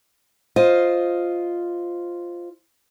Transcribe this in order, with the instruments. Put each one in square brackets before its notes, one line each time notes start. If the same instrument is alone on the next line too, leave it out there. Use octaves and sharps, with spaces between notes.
[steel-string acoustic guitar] F4 C5 D#5